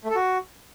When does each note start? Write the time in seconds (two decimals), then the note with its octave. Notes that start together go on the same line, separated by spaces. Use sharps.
0.05 A3
0.10 A4
0.15 F#4